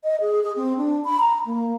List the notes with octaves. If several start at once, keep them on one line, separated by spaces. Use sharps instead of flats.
D#5
G#4
G#4
C4
D4
B5
A#5
A#3